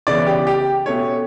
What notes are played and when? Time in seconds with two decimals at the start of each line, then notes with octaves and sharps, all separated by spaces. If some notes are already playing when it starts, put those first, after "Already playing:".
0.07 C#3 E3 B3 D5
0.27 G4
0.47 G4
0.86 B2 A3 C#4 C#5